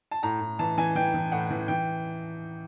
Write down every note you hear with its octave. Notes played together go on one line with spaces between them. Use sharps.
A5
A2 A#5
A2
E3 A5
E3 G#5
E3 G5
E3
A2 F#5
E3
E3 G5